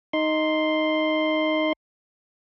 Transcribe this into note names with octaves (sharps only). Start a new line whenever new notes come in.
D#4 C6